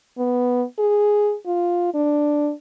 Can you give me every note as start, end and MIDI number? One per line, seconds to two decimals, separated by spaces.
0.18 0.63 59
0.79 1.35 68
1.46 1.91 65
1.94 2.52 62